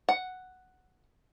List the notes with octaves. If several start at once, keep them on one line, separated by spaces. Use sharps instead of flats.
F#5